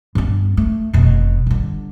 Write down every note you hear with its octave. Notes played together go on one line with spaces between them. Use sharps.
G2 B3
A3
F1 B2
G1 D3